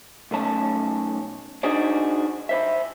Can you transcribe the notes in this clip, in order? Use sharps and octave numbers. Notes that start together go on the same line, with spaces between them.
B1 A3 C#4 A5
D4 D#4 F#4 G#4 C5 D5
E4 C5 E5